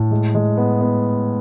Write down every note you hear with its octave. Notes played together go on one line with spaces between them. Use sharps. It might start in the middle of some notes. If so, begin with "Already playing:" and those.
Already playing: A2
G#3
G#3
B3
B3